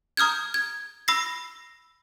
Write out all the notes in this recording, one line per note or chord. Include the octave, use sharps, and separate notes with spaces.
A#5 D#6 F6 G6 G#6
G#6
B5 E6 A#6 C7